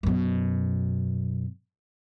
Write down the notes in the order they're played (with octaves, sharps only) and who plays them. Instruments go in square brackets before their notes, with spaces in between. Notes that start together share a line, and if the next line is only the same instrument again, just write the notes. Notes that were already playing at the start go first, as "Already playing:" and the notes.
[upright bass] F#2 B2